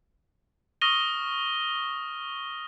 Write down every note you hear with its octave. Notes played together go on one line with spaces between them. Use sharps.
C#6 D#6 F6 A#6 D#7 G7